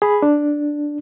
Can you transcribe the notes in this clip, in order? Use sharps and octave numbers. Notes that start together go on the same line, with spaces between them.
G#4 B5
D4